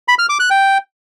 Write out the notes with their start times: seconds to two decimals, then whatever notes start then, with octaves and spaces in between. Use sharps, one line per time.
0.08 B5
0.19 F6
0.29 D6
0.40 F#6
0.50 G5